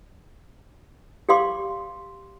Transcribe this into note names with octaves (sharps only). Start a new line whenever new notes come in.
G4 D5 F5 C6 D6